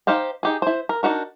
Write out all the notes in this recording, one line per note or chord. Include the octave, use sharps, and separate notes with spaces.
D#4 G4 C5 F5 G5
D#4 G4 G#4
E4 C5
A#4
D4 D#4 F#4 A#4